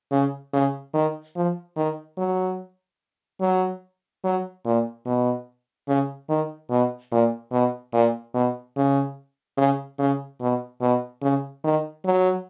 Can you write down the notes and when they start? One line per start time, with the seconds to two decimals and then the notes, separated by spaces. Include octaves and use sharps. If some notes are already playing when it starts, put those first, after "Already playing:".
0.11 C#3
0.53 C#3
0.94 D#3
1.36 F3
1.77 D#3
2.18 F#3
3.41 F#3
4.24 F#3
4.65 A#2
5.06 B2
5.88 C#3
6.29 D#3
6.70 B2
7.12 A#2
7.52 B2
7.93 A#2
8.34 B2
8.77 C#3
9.58 C#3
9.99 C#3
10.41 B2
10.81 B2
11.22 C#3
11.64 D#3
12.05 F#3